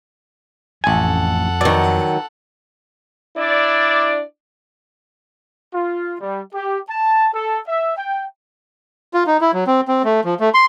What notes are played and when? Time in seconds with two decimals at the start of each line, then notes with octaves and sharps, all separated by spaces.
0.84 A1 F2 A4 F#5 G#5
1.61 D#3 F#3 D5
3.37 D4 E4 D5
5.73 F4
6.20 G3
6.54 G4
6.89 A5
7.33 A4
7.67 E5
7.96 G5
9.14 F4
9.27 D#4
9.41 E4
9.53 F#3
9.67 C4
9.88 C4
10.05 A3
10.24 F3
10.40 A3
10.54 C6